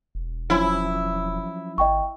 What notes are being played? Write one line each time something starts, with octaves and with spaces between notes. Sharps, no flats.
E1
F3 F#3 C#4 E4
G#1 D#5 G5 C#6